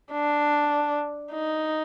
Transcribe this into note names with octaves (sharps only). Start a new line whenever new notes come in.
D4
D#4